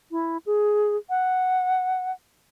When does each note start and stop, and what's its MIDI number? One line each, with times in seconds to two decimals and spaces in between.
0.11 0.38 64
0.46 0.96 68
1.10 2.11 78